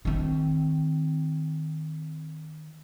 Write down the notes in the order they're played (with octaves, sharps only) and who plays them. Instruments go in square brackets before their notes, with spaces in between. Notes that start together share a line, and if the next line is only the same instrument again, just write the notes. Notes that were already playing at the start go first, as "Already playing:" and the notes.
[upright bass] D#3 C4